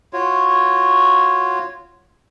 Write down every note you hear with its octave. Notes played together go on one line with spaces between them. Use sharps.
F4 F#4 C#5